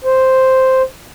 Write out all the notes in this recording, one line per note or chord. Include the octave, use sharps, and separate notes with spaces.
C5